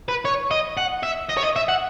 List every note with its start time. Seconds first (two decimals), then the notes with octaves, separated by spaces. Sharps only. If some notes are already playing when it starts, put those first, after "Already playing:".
0.09 B4
0.25 C#5
0.51 D#5
0.77 F#5
1.03 E5
1.30 D#5
1.37 C#5
1.43 D#5
1.56 E5
1.68 F#5